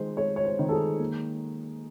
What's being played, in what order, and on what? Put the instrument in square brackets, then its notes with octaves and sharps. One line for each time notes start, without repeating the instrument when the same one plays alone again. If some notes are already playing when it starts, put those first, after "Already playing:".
Already playing: [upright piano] D#3 G#3 C5
G#3 C#5
C#5
C5
D#3
A4
G#4
A#3